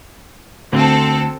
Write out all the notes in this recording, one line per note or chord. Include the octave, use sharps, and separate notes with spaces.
D2 C4 A4